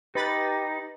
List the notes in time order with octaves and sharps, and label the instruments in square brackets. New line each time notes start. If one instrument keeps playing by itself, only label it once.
[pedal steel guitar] D#4 [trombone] G4 [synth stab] B4 B5 A6